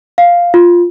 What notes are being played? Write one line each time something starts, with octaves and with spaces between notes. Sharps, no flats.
F5
F4